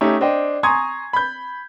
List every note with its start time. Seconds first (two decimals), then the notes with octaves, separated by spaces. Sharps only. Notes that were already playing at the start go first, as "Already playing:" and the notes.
0.01 A3 C#4 D#4 G4 C#5
0.21 D4 C5 D#5 G5
0.63 G#5 A#5 C6 C#6 D#6 G#6
1.13 B5 G6